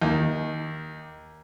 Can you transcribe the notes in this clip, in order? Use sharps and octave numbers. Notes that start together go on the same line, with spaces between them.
D#2 D#3